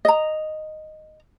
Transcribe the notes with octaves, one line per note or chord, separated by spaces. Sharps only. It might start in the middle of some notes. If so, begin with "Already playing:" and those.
D#5 A#5